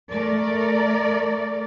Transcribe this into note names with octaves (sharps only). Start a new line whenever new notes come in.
A3 A#4 D5